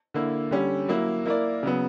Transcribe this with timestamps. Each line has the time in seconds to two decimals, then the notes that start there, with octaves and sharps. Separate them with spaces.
0.14 D3 A#3 E4
0.51 D3 G3 C#4 G4
0.88 F#3 A#3 E4
1.26 A#3 E4 A#4 D5
1.63 C#3 F#3 B3